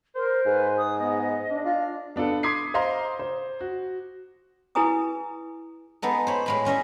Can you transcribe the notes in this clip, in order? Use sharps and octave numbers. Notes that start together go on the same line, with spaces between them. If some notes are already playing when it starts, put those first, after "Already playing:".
A#4 C5
G#2 B4
D#6
B3 D#5
D4
F4
B3 D4 F4 A4
C6 D6 D#6 G#6 B6 C7
C5 D#5 F5 A#5 C6
C5
F#4
E4 G#4 B4 G#5 A#5 D#6
G#3 B3 D#4 A4
C5 C#5 B5
A2 G#3 B5
G3 C#4 D#5 E5